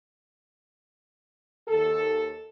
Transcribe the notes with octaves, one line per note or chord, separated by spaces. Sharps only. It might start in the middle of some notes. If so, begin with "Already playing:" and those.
D#2 A4